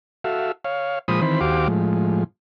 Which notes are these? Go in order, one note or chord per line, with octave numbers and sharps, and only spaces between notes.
F#4 A4 E5 F5
C#5 F5
A#2 F3 G#3 C5 B5 D#6
D#3 E3 C4 C5 B5
D#2 F#4 G4 C5 F5 D6
A2 F3 G#3